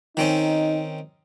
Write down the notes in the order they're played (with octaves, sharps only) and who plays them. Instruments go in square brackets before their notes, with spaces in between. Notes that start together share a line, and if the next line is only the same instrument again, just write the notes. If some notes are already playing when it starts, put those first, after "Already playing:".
[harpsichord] D#3 C4 C#4 [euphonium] D#4